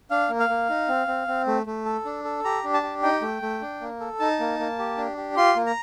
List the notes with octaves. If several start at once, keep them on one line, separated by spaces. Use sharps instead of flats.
D4 F5
A#3
F5
A#3
D#4
C4
C4
C4
A3
A3
A4
D4
A4
G4 A#5
D4
A5
G4
D#4 G5
A3
A3
D4
A#3
A4
D#4 A5
A#3
A#3
G4
D4
G4
F4 C6
A#3
A#5